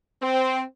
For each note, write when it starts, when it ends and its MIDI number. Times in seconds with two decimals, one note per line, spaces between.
0.21 0.62 60